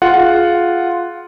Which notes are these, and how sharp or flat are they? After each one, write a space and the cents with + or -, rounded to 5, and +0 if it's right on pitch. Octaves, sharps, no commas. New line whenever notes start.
F4 +0 G#4 +20 F#5 +0